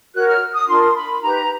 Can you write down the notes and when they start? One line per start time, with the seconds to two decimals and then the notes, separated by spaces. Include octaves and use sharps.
0.14 F#4 A#4 C#5 F#6
0.27 F6
0.54 D#6
0.67 D4 F4 A#4 C6
0.94 B5
1.21 D#4 G4 B4 A#5